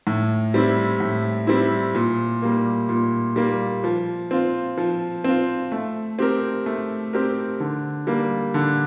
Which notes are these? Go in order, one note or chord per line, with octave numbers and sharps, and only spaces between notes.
A2
G3 C4 E4
A2
G3 C4 E4
A#2
G3 A#3
A#2
G3 A#3
F3
C4 F4
F3
C4 F4
A3
C4 G4 A#4
A3
C4 G4 A#4
D3
G3 A#3
D3